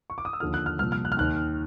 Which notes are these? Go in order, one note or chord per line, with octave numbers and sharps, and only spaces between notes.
C#6
D6
D#6
E6
D#2 D3 F3 F6
F#6
F6
C2 A#2 F3 F6
F6
F#6
F6
D#2 D#3 F#6